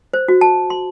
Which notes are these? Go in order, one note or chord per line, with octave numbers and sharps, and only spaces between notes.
C5
F#4
A5
C6